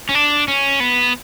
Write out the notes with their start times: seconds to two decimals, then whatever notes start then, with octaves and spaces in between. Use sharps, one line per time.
0.09 C#4
0.15 D4
0.48 C#4
0.80 B3